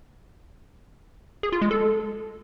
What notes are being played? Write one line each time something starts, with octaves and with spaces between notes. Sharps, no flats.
G#4
F4
G#3
A4